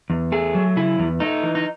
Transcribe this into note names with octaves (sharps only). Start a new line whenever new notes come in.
E2
A3 G#4
F#3
C#3 E4
E2
A3 D#4
E3
D#4